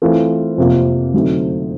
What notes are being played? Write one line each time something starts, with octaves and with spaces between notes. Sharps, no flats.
E3 A3 C4 F4 A#4
F2 C3 F3 A#3
D3 F#3 A3 C4 D#4